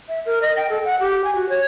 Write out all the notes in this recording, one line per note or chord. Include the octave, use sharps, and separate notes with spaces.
E5
A#4
D#5
G5
A4
F#5
G4
G#5
F#4
C#5